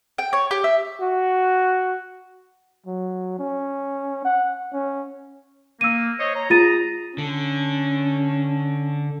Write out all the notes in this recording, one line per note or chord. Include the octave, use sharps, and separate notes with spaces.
G5
C#5
G4
E5
F#4
F#3
C#4
F#5
C#4
A#3 E6 D#7
C5 C#5 D#5
C#5 A#5
F4 G#4 A#5 A6 D#7
D3 C#4